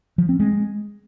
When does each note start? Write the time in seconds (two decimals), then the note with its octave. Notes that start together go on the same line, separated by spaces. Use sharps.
0.18 F3
0.29 C4
0.40 G#3